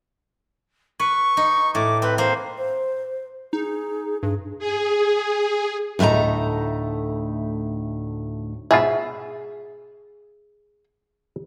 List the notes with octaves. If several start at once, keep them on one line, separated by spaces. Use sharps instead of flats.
B4 C#6
D#4
A2 D6
C4 B4
A#3 C5
C5
D#4 G#4
G2 G#4
G#4
D2 A2 A3 D#4 A#5
G#2 B2 F4 G#4 E5